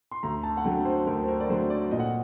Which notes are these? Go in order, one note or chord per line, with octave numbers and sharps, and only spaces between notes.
C6
D2 A#5
A5
F#5
D3 F#3 A3 G5
C5
D2 A#4
C5
A#4
D5
D3 F#3 A3 C5
D5
A#2 D#5
F#5